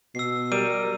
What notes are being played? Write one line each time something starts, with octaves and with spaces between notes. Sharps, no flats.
B2 E6 C7
G3 A#4 D#7